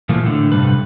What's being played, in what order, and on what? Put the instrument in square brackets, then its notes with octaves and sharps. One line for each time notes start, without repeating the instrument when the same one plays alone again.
[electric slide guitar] A#2 E3 F3 A3 A#3
A2 D3
G2 C3 G3 B4